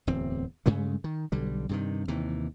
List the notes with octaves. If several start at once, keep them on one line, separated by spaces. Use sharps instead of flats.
D1 E2 C4
G2 C#3 G#3 A3
D#3
B1 D3 G3
G2 C3 D#3
D#2 C3 E3